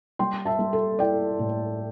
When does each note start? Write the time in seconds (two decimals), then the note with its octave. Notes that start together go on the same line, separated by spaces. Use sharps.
0.19 G3 G5 C6
0.45 E5 A5
0.59 G3
0.73 A4
0.99 E4 D5 G5
1.39 A2